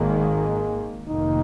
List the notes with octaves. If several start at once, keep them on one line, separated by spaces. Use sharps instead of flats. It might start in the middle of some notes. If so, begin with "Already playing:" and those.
Already playing: G#1 G#2 D#3 G#3 A#3
F1 F2 D#3 A#3 D#4